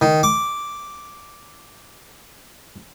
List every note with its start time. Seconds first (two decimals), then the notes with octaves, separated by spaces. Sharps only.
0.01 D#3
0.23 D6